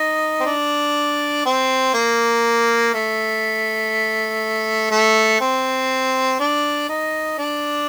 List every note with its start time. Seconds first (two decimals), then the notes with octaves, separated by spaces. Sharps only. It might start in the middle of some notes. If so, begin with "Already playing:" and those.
Already playing: D#4
0.40 C4
0.46 D4
1.45 C4
1.94 A#3
2.94 A3
4.91 A3
5.41 C4
6.40 D4
6.89 D#4
7.38 D4